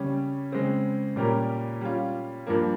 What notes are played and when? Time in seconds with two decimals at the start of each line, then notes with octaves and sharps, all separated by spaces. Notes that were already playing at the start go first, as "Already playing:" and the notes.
Already playing: C#3 G3 C#4
0.52 C#3 G#3 C4
1.16 A#2 G3 C#4 G4 A#4
1.81 G3 C#4 F4
2.47 G2 F3 A#3